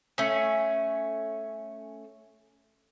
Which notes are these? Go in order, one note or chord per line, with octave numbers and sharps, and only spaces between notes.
A3 C#4